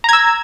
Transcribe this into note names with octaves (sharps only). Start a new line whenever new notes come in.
A#5 E6 G#6